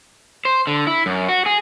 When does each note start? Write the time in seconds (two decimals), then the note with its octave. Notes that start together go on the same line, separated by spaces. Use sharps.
0.45 C5
0.67 D3
0.87 E4
1.06 F#2
1.29 F#4
1.46 G#4